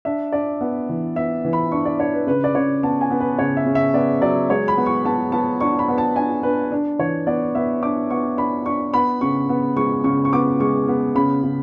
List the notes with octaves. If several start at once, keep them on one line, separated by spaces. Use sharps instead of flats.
D4 E5
D4 D5
B3
E3
B3 E5
E3
B5
D4 C#6
D5
D4 C#5
B4
C#3 B4
D5
C#3 C#5
B3 A5
G#5
B3
B4
C#3 C#5
E5
C#3
E5
B3 D5
F#3 D5
G#3 C#5
B5
B3
C#6
B3 A5
B3 A5
D4 C#6
B5
B3
A5
D4 G#5
D4 B4
D4
E3 C#5
B3 D5
B3 E5
D4 D6
B3 C#6
D4 B5
D4 C#6
B3 B5
C#3 C#6
B3
G#3 C#6
C#3 C#6
C#6
B3 D6
G#3 C#6
B3
C#3 B5
C#3